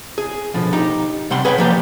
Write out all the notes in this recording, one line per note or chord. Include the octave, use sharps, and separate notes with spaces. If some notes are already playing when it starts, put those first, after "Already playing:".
G#4
B2 D3 F3
D#4 G4
C3 G3 F#5 G5 C6
G#4 B4 C#5 F#5 G5
F3 G3 A#3 B3 G4